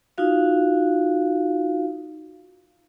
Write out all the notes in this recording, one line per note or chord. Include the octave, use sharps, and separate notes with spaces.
D#4 F4 F#4 F5